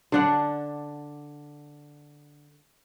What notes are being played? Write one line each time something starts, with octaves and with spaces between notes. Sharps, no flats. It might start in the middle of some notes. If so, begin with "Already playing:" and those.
D3 D4 F#5